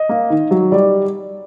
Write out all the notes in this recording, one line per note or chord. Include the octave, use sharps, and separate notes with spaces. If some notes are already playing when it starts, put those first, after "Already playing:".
Already playing: D#5
A#3
D#3
F#3
G3 D5